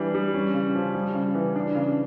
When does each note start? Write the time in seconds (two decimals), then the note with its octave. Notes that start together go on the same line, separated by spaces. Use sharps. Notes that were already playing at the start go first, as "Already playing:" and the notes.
Already playing: E3 G3 D4
0.14 G3
0.34 C#4
0.54 C#3
0.75 F3
0.95 G3
1.14 C#3
1.35 E3
1.55 D4
1.75 C#3